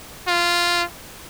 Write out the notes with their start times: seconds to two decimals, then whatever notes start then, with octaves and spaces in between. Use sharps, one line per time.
0.28 F4